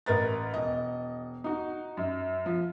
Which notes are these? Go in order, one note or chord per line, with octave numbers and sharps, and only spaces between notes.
A1 A#4 B4 A6
E1 D#5
D#4 F#4
F#2
F3